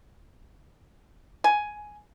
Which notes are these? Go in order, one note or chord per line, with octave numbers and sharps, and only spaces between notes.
G#5